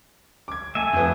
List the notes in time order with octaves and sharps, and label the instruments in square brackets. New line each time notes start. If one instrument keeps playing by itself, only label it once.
[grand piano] D6 G#6
[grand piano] A3 [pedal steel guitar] E5 G#5
[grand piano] F2 B3